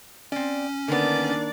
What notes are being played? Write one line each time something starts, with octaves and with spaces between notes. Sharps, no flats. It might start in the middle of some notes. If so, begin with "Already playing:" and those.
C4 C#4 D5
D3 D#3 A#3 B3 D4 D5